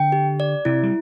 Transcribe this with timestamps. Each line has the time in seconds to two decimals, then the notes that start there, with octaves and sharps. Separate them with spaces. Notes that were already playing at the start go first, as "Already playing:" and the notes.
Already playing: D3 G5
0.12 G4
0.40 D5
0.65 C3 E4
0.83 G3